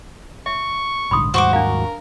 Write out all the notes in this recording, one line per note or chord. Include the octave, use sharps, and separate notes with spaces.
E5 C#6
A#1 G#2 D3 B5 C6 D#6
D#2 G#2 G3 F#4 C5 C#6 D6
D4 A#4 F5